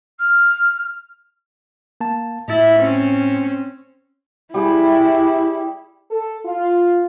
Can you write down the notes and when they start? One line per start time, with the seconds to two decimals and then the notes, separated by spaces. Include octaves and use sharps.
0.19 F6
2.01 A#3 A5
2.48 A2 E4 A6
2.78 C4 C#4
4.54 G3 E4 G4 G#4
6.11 A4
6.44 F4